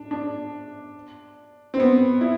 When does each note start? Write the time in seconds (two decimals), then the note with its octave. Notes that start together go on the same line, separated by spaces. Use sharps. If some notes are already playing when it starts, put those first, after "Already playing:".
Already playing: D4
0.11 D4
1.74 C4
1.80 B3
2.21 E4